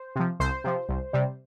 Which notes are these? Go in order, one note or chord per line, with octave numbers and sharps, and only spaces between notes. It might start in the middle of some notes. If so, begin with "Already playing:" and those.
Already playing: C5
C3 F3
C2 C5
C3 F3
C2
C3 G3